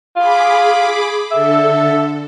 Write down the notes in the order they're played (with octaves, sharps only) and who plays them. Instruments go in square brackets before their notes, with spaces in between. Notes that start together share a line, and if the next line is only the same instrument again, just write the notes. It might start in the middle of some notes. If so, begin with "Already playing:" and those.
[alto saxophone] F4 [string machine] G#4 B5 D6
[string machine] D3 A4 [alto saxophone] E5